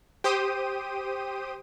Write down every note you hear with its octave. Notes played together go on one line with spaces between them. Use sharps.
G4 C5 G5 D#6 D#7